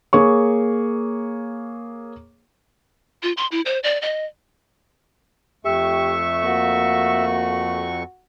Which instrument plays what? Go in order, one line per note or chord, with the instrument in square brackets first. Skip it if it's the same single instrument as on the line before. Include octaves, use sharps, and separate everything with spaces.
[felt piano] A#3 G#4 C#5 C#6
[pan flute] F4
C6
E4
C5
D5
D#5
[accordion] F2 A3 C#6 [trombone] G4 [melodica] E5
[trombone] A#3 [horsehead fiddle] F#4